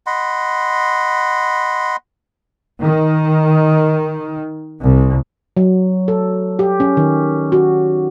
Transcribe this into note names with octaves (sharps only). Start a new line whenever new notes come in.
D#5 F#5 B5 C6
D#3
C2
F#3
A4
G4
C#4
D#3
F#4